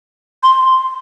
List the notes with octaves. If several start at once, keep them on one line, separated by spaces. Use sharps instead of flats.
C6